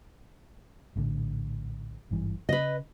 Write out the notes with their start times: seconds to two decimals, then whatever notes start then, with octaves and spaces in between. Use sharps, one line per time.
0.96 A#1 A2 D3
2.11 G#1 G2 E3
2.49 C#3 B4 D#5